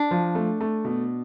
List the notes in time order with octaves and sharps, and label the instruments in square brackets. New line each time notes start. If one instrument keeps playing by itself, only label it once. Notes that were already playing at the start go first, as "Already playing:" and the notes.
Already playing: [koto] D4
[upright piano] F3
A3
A3
B2